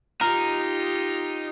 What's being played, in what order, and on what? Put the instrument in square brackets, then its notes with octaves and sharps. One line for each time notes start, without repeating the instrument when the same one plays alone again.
[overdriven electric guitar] D#4 [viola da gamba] F4 G4 [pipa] A#4